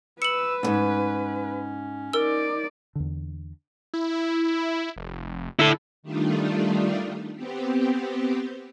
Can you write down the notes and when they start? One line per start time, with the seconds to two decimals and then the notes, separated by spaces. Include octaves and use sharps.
0.22 B4 E6 C#7 F#7
0.63 D2 G#2 C#4
2.13 D#4 A#4 D5 E6
2.95 E2 D3
3.94 E4
4.97 F1
5.59 D3 E4 A4
6.03 D#3 G3 A3 D4 D#4 F4
7.35 B3 C4 G4